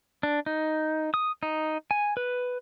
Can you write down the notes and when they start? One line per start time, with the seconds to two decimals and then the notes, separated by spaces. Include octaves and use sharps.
0.23 D4
0.46 D#4
1.14 D#6
1.43 D#4
1.91 G#5
2.17 B4